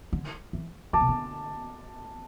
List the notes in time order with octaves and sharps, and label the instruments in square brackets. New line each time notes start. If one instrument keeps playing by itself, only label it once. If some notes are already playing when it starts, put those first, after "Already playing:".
[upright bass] D3
E3
[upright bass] D3 [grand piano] A5 D6
[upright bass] B2
D3